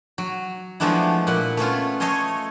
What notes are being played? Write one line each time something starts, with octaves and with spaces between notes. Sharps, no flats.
F#3
F3 G#3 A3 B3 D4 E4
A#2 B4 F#5
A3 B3 C#4 F4
A3 A4 C#5 D#5 G#5 C6